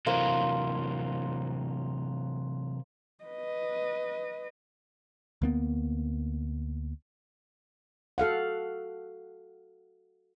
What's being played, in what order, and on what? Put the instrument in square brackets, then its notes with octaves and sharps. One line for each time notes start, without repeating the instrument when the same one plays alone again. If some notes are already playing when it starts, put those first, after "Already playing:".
[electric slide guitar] C3 E3 F#3 [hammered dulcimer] A#4 C5 F5
[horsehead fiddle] B4 D#5
[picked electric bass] D2 A#3 B3
[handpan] F#4 A4 F5 F#5